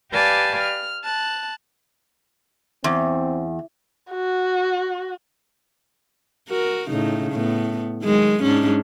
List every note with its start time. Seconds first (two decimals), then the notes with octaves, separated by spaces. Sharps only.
0.12 G4 B4 D5 F5 G#5 A5
0.61 F6
1.03 A5 F#6
2.84 E2 C4
4.12 F#4
6.49 F#4 A#4
6.90 A2 C#3 D#4
7.32 A2 B3
8.02 D#3 F#3 G#3
8.42 G#2 C#4 D4